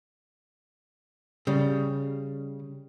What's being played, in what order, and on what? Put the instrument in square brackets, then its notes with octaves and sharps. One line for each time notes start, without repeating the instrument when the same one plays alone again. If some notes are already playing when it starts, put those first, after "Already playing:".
[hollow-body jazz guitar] C#3 G3